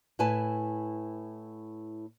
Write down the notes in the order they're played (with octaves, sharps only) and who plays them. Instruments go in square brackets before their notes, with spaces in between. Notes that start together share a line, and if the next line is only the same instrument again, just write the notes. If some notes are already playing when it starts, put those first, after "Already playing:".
[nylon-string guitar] A2 E4 B4 G#5 A5